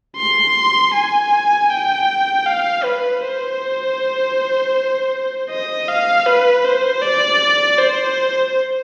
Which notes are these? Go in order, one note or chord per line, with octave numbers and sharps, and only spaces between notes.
C6
G#5
G5
F5
B4
C5
D#5
F5
B4
C5
D5
C5